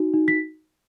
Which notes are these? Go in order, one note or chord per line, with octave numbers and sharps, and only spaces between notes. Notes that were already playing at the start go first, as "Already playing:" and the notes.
Already playing: D#4 F#4
D#4
B6